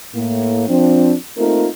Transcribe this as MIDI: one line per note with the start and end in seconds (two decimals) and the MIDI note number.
0.15 0.65 45
0.15 0.65 58
0.68 1.14 53
0.68 1.14 60
0.68 1.14 62
1.37 1.67 57
1.37 1.67 58
1.37 1.67 60
1.37 1.67 63
1.37 1.67 65
1.37 1.67 70